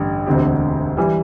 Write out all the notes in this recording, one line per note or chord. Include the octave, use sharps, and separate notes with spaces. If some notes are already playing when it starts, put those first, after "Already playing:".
Already playing: A1 G2 D3
E1 D2 D3 C4 G4
E3 G3